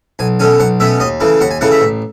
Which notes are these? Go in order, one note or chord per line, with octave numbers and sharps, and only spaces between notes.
B1 G#5
B2 A3 C#4 G#5
B1 F#5
B2 A3 C#4 E5
D#2 D#5
C#3 E3 A3
D#2 F#5
G#5
C#3 E3 A3 F#5
E5
A1